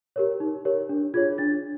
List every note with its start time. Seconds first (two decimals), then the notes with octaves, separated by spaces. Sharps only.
0.16 G4 A#4 C#5
0.40 D#4
0.65 G4 A#4 C#5
0.89 D4
1.14 F4 G#4 C#5 G#6
1.38 D4 A6